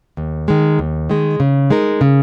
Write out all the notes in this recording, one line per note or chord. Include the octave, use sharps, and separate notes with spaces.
D#2
D#3 G#3
D#2
D#3 G#3
C#3
G#3 D#4 A#4
C#3